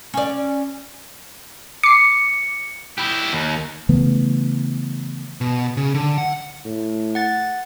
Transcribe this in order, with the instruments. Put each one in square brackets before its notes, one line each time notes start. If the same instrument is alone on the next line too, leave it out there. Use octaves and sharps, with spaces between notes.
[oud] C#4 D5
[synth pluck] D6 C7 [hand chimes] C#7
[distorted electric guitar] E4 G4
D#2
[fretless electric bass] C#3 E3 A3 B3
[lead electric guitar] B2
C#3
D3
F#5
[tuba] A2
[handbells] F#5 A6